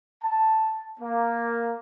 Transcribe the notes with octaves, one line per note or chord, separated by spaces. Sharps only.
A5
A#3